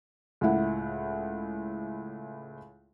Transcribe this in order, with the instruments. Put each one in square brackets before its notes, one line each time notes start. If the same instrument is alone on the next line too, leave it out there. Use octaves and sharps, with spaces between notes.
[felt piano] C#2 A2 E4 F#5